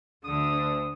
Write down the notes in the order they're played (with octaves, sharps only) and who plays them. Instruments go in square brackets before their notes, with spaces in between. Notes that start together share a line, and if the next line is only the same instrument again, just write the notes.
[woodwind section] D2 D#6 [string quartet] D3